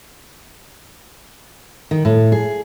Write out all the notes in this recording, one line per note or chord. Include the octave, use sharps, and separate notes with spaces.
D#3
A2
G#4